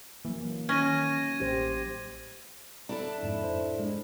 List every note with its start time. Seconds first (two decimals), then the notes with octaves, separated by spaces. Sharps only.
0.25 E3 F#3 A#3
0.69 D#3 C#4 G#6 A#6 D#7
1.40 A1 G4 C5
2.89 D4 E4 A4
3.23 F2 G#2
3.44 C5
3.79 G#3